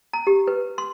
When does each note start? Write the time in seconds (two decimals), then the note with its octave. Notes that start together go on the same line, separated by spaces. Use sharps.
0.13 A#5
0.27 G4
0.48 B4
0.78 C6